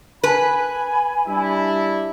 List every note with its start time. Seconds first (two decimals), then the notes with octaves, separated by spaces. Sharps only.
0.24 B4 G#5 B5
1.28 G3 D4 E4